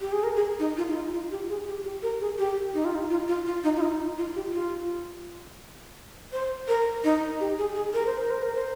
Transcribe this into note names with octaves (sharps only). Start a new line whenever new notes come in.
G4
G#4
A#4
G#4
D#4
F4
D#4
F4
F4
G4
G#4
G4
G4
A#4
G#4
G4
D#4
F4
D#4
F4
F4
F4
D#4
F4
D#4
F4
G4
F4
C5
A#4
D#4
G4
G#4
G#4
A#4
C5
A#4
C5
A#4
C5